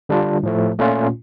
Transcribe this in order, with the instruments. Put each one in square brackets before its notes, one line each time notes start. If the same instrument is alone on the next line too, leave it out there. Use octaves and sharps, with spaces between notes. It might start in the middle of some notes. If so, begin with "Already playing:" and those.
[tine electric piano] D3 G3 D4 F4
A2 F3 A3
A#2 A3 C#4 F4